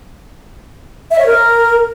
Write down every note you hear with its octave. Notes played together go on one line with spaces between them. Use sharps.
E5
C#5
A#4